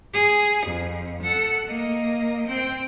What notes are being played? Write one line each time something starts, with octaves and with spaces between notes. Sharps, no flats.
G#4
F2
A4 F#5
A#3 D#5
C4 G5